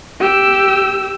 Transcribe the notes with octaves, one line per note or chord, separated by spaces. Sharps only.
G4 E6